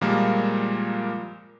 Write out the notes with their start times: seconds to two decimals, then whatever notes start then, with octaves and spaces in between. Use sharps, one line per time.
0.01 A#2 F3 G3 G#3 A#3 A#4